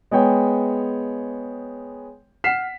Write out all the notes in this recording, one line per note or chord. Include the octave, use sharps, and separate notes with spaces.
G#3 B3 G#4 C#5 G5
F#5 F6 B6 C7 E7